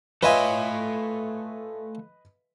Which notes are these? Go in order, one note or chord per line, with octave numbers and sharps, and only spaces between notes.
A3 F4 B4 C#5 D#5 E5 G#5